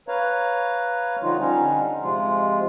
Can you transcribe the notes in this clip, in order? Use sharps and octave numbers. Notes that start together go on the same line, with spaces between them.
B4 C#5 F5 A#5
D3 F3 G3 D#4 F4
D3 G3 C#4 D#4
C3 F3 G#3 F4